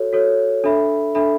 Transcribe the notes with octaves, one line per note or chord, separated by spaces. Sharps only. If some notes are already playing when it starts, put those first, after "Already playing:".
Already playing: F#4 A4 C#5
F#4 A4 C#5
D4 A4 E5 B5
D4 A4 E5 B5